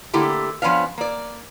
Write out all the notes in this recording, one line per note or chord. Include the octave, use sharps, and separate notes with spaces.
D3 A3 A#3 E4 G4
F3 B3 C#4 D4 F5
A#3 D5